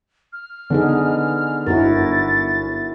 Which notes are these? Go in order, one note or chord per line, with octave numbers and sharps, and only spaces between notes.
F6
D3 B3 D#4 G#4
G1 E4 F#4 A#4 A6